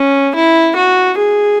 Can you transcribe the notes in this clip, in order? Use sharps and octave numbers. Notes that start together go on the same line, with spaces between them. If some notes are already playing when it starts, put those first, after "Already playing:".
Already playing: C#4
E4
F#4
G#4